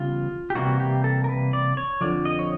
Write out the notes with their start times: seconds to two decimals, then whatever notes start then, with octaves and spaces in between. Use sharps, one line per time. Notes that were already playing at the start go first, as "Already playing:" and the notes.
Already playing: C#3 E3 G3 B3 F4
0.50 G4
0.55 C3 E3 G3 A#3 F#4
0.80 G4
1.04 A4
1.24 A#4
1.29 B4
1.53 D5
1.77 C#5
2.01 F2 D3 F3 D5
2.25 D#5
2.39 C#5